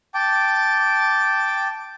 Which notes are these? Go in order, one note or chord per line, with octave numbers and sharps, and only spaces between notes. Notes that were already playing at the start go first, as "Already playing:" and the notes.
G5 A5 D6